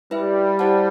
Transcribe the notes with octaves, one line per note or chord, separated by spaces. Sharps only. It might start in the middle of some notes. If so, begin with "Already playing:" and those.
G3 E4 B4 E5
E4 G4 C5 F#5 A5